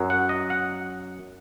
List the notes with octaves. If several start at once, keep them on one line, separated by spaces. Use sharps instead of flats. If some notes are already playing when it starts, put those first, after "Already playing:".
Already playing: F#2 F#3
F#5
D#5
F#5